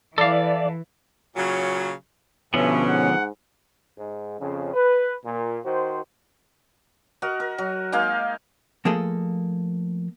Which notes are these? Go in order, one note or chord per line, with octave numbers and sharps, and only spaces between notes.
E3 A4 D5 F5
A#2 C#3 F#3
G2 B2 D3 F3 B3 C#4 E5
G#2 F#5
G#2
F2 C#3
B4
A#2
D#3 F#4 C5
F#4 A#4 D#5
A#4
F#3
G#3 A#3 D#4 F5
F3 A3 A#3 G#4 A4 D#5